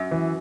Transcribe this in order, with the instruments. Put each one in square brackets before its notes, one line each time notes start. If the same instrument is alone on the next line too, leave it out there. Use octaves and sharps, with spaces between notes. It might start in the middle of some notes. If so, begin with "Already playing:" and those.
Already playing: [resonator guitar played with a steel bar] F#2
[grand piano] E3